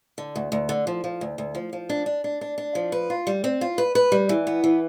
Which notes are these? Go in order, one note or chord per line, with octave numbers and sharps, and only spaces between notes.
D3
D2
D2
D3
F3
F3
D2
D2
F3
F3
D4
D4
D4
D4
D4
F3
B4
F4
G3
C4
F4
B4
B4
G3
E3
B3
E3